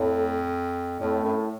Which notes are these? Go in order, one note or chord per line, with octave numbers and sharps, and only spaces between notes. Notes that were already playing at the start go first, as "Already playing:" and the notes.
Already playing: F2 A2
F2 A2
F#2